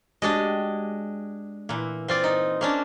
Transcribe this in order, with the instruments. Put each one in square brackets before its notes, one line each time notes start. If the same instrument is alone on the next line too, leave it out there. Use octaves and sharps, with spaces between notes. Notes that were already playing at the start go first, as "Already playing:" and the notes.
[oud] G#3 F#4 G4 [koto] D4 D5 D#5
[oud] A#2 E3 [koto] A#3
[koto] C4 F4 D5
D#4
A#3 C#4 D4